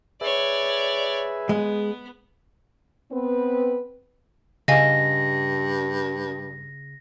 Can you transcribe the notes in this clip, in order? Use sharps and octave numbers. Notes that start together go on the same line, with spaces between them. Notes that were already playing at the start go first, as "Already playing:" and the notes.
G#4 B4 C#5 D5 E5
G#3 B3
B3 C4 B4
G2 C#3 D#5 F5 G#5 A#6